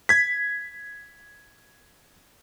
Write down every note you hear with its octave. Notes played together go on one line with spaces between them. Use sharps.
G#6 B6